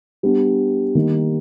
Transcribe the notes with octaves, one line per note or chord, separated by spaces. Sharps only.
G3 B3 D4
D#3 G3 A#3 D#4